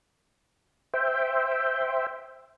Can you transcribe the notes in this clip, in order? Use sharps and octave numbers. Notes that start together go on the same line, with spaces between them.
C5 E5 G5